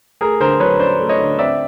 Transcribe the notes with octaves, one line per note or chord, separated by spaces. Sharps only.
A3 G#4 A#4
D3 A#4 C5
F#3 B4 C#5
C#4 C5 D5
A3
C#5 D#5
D3
C4 D5 E5